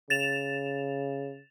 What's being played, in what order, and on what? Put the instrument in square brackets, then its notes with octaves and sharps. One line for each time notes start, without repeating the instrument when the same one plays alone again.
[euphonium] C#3 [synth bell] A6 E7 F7